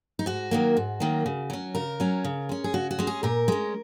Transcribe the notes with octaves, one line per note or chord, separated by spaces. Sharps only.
D#4
G#2 F#4
D#3 F#3 A#3
G#2
D#3 F#3 A#3
C#3
F#3 C#4
C#3 A#4
F#3 C#4
C#3
G#3 C#4
G#4
C#3 F#4
F#4
G#3 C#4
G#4
A#2 A#4
G#3 C#4